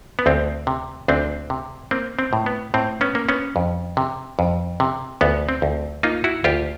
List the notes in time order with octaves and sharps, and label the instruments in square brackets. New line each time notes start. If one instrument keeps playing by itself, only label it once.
[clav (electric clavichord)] B3
D2 C4
C3
D2 C4 D4
C3
A#3 C4
C4
A2
B3
A2 C4
B3 C#4
A#3
B3 C#4
F2
C3
F2
C3
D2 B3
C4
D2
A#3 D#4 F4
E4 F#4
D2 F4 G4